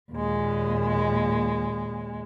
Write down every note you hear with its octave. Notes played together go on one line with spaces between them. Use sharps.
D#2 A#2 G#3